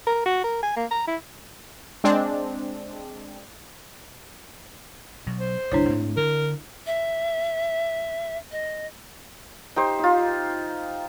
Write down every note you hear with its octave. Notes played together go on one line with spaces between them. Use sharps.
A#4
F#4
A#4
G#5
A#3
A#5
E4
G#3 C4 D4
B2 F#3
C5
G1 C2 D4 E4 C#5
G#2 A3 C4
D3 A#4
E5
D#5
D#4 G4 C5
D#4 F4